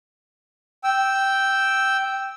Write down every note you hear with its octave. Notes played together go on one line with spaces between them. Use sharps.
G5 E6